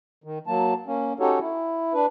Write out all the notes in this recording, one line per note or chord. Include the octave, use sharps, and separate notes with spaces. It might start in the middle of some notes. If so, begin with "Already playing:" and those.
D#3
F#3 A#3 A5
A#3 C#4
C#4 D#4 F#4 G4 A4 C#5
E4
D4 B4